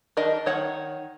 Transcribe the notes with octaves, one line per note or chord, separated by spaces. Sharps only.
D#3 D4 A#4 D#5
D#3 C#5 F#5